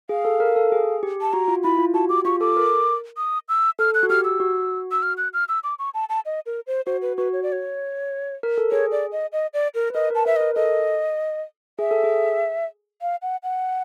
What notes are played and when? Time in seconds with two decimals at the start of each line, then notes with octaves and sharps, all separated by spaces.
0.09 G#4 F5
0.25 A4
0.40 A#4
0.56 A4
0.72 G#4
1.03 G4
1.21 A5
1.33 F#4 A#5
1.48 F4
1.64 E4 B5
1.79 F4
1.94 F#4 A5
2.09 G4 D6
2.25 F4 C#6
2.41 A4 D6
2.57 A#4
3.17 D#6
3.49 E6
3.79 A4 F6
3.94 F#6
4.03 F#4
4.10 G4 F6
4.25 E6
4.40 F#4
4.92 E6
5.02 F6
5.18 F#6
5.34 F6
5.49 E6
5.64 D6
5.79 C#6
5.94 A5
6.09 A5
6.26 D#5
6.46 A#4
6.67 C5
6.86 F#4 C5
7.02 B4
7.17 F#4 B4
7.33 C#5
7.43 D5
7.52 C#5
8.43 A#4
8.58 A4
8.71 G#4 C#5
8.92 D5
9.12 D#5
9.32 D#5
9.54 D5
9.75 A#4
9.90 B4
9.94 A#4 D#5
10.10 A#4
10.15 A5
10.26 B4 E5
10.36 A#4 D#5
10.55 A4 D#5
11.79 G#4 E5
11.91 A4
12.04 G#4
13.02 F5
13.22 F#5
13.43 F#5